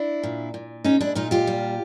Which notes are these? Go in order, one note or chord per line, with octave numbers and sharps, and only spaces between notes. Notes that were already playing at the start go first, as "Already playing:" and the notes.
Already playing: D4 E4
A#2
A#2
G#3 C#4 D#4
D4 E4
A#2 D#4 F4
F4 G4
G3